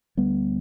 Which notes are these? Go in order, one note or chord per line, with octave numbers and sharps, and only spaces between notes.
D2 G3 B3